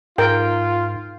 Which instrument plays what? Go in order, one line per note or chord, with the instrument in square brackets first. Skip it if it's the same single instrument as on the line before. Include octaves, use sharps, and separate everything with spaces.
[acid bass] G#2 [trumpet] F4 [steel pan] A#4 G5